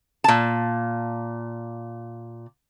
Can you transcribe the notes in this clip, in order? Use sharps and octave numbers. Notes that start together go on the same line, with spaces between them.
A#2 A5